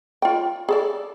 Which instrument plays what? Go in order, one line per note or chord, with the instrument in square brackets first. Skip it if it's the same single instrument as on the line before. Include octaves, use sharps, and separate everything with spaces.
[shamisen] F4 G5
G#4 A4 D5